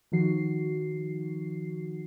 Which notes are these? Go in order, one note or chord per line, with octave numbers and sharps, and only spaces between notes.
D#3 F3 D#4 F#4 C7